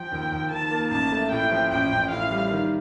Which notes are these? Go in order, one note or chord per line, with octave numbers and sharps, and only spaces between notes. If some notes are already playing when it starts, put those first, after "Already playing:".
Already playing: F3 G5
D#2
D#2
D#3 A5
A#3
A1 A5
A3
A2 G5
F3
A1 G5
A1
A2 F5
G3
D#3